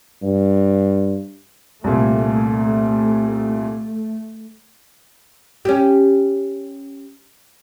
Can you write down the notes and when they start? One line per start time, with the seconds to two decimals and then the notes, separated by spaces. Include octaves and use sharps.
0.22 G2
1.84 C2 A#2 A3
5.65 C#4 G4